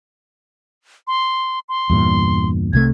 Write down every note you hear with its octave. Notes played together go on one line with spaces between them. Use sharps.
C6
C6
E2 G2 A#2
C2 C3 A3 G#6